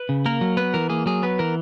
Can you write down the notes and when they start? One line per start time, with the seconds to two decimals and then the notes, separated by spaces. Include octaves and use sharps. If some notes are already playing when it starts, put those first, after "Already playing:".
Already playing: B4
0.09 C#3
0.26 A#3 A#4
0.41 F#3
0.57 B3 B4
0.74 E3 A#4
0.90 A#3 G#4
1.06 F#3 G#4
1.23 B3 B4
1.39 E3 A#4